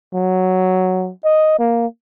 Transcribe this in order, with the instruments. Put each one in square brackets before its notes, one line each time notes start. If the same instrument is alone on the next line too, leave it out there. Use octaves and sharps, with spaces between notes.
[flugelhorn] F#3
D#5
A#3